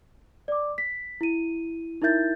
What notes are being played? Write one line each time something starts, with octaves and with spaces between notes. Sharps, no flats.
D5 D6
B6
E4 D#7
D#4 E4 A#4 E5 G6 A6